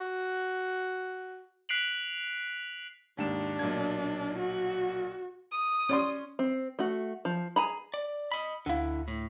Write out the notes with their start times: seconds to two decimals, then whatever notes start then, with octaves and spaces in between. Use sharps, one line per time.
0.01 F#4
1.69 F#6 B6 C7 D7 F7 F#7
3.18 D#2 G#2 D4 E7
3.59 B1 A#2 G#6
4.38 F#4
5.52 D#6
5.89 C#4 D5 C6
6.39 C4
6.79 A3 F#4
7.25 F3
7.56 G#4 G#5 A#5 B5
7.94 D5
8.32 D#5 B5
8.66 D2 D3 E4 F5
9.08 A2